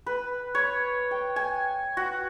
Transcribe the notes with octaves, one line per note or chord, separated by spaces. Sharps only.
B4
C#5
G5
G#5
F#4